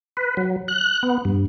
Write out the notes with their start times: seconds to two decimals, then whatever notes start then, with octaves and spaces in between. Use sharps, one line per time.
0.17 B4
0.37 F#3
0.68 F#6
1.03 B3
1.25 G2